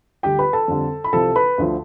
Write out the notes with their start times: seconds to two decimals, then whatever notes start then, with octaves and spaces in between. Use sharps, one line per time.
0.23 D2 D3 G3 G4 G5
0.39 B4 B5
0.53 A4 A5
0.68 F2 D3 G3
1.04 B5
1.13 C2 C3 F3 A4 A5
1.36 B4 B5
1.58 D2 D3 F3